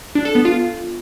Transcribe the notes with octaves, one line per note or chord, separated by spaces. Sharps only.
D4
A4
B3
F4